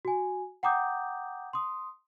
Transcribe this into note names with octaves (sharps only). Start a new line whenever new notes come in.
F#4 G#5
F#5 G5 A#5 D6 D#6 G6
C6 D#6